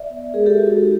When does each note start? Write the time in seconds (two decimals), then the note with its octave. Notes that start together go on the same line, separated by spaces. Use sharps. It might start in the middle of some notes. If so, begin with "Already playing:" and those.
Already playing: D5 E5
0.10 B3
0.34 G#3 G#4 A#4
0.46 G4 A4
0.58 G#3 F#4 G#4
0.71 G4
0.82 D#4